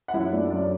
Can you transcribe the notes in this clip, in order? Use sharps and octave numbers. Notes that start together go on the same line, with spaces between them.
F#5
F#2 E4 E5
A3 D4 D5
F#2 D4 D5